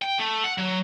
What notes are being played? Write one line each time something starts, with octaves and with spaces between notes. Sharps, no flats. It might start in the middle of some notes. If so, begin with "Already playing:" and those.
G5
A3
F#5
F#3